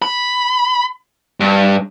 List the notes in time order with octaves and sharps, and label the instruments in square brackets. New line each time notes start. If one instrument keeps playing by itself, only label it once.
[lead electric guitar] B5
G2